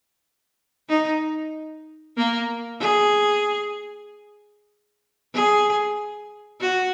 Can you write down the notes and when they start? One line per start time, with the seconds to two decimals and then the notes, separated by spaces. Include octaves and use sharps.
0.89 D#4
2.17 A#3
2.81 G#4
5.34 G#4
6.61 F#4